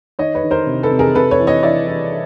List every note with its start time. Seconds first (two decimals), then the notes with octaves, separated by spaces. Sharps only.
0.19 D#3 C#5 D#5
0.35 B4 C#5
0.44 D#3
0.51 A#4 C5
0.67 C3
0.83 A4 B4
0.91 C3
0.99 G#4 A#4
1.15 C3 A4 B4
1.31 B4 C#5
1.40 E3
1.47 C#5 D#5
1.63 E3 D5 E5
1.87 E3